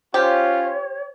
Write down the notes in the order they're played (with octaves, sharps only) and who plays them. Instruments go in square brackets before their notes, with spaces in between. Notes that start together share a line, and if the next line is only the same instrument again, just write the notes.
[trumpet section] C#4 F4 [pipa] G4 [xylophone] C5 [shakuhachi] C#5